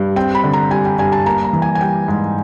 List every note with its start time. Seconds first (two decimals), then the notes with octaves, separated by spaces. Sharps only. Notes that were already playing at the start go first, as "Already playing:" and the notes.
Already playing: G2
0.16 C4 G5
0.35 B5
0.44 D3
0.53 A#5
0.71 G3 G#5
0.85 G5
0.98 G2 G#5
1.12 A5
1.26 A#3 A#5
1.44 A#5
1.53 E3
1.62 G#5
1.75 G#5
1.81 G3 G5
2.08 G#2